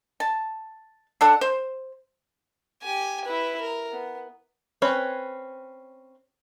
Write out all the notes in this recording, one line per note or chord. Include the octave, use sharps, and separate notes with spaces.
A5
D4 A4 F#5
C5
G4 G#5
E4 B4
A#4
B3
C4 C#4 B4 C#5